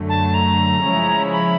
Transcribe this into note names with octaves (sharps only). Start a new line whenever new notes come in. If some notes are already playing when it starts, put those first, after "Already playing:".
Already playing: F#2 D3 F#3 A3
A5
A#5
C#3 F3 G#3 C#4 E4
B5